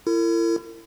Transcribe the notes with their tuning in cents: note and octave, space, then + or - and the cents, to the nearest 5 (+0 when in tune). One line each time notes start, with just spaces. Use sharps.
E4 +35 A#4 -45